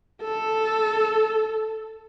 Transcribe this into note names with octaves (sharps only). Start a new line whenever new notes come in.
A4